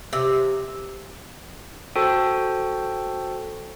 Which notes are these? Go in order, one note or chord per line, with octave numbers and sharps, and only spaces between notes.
C3
F#4 A4 C5 G5 A5